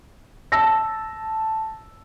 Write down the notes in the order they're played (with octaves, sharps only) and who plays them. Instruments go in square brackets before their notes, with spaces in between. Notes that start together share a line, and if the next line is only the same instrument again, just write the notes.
[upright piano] A5 E6 A#6